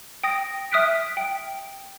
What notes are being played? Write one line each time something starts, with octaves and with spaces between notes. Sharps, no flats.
G5 D#6 A#6
E5 D#6 F6 F#6 B6 D7
G5